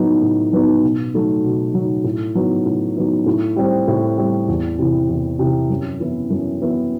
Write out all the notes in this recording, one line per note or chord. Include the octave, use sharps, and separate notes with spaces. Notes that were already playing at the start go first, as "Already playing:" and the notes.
Already playing: A2 F#3 B3 D#4
A2
F#3 B3 D#4
B2
F#3 A3 D#4
B2
F#3 A3 D#4
A2
F#3 B3 D#4
A2
F#3 B3 D#4
A2
G3 C4
A2
G3 C4
E2
C3 E3
E2
C3 E3
F#2
E3 B3 E4
F#2
E3 B3 E4